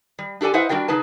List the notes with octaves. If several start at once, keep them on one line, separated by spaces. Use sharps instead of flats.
G3
D4 G4 A4 D5 G#5
E4 B4 C5 D#5 E5 F#5
G3 D4 F#4 A#4 G5
C#3 D#4 G#4 B4 A5